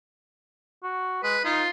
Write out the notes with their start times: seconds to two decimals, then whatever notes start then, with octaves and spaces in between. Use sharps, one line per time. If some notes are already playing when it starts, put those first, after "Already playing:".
0.83 F#4
1.23 G#3 B4
1.45 D#4 F4